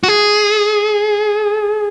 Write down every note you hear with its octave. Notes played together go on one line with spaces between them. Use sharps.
F#4
G#4